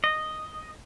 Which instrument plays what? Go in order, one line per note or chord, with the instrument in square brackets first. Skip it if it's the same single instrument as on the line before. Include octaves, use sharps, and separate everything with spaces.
[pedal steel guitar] D#5